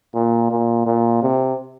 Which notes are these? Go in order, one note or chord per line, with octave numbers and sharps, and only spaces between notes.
A#2
A#2
A#2
C3